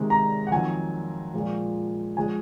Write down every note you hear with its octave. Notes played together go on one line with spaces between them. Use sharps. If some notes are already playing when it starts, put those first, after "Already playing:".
Already playing: C3 D#3 G#3
A#5
F#5
F2 D#3 F#3 G#5
A#2 F3 G#3
F3 G#3 G#5